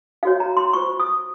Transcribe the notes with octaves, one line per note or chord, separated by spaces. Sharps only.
D#4 F#4 C#5 F5
A#5
C6
F4 C5 C#6
D#6